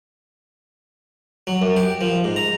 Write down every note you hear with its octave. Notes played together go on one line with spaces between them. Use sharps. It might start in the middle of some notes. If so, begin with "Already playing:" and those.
F#3
F#2
G4
F3
G#2
A#5